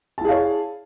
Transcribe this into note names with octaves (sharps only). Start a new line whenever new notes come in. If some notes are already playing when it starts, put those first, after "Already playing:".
E4 G#4 C#5 F5 A5